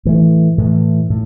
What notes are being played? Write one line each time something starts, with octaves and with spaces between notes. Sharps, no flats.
A2 E3 A3
A2 E3 A3
A2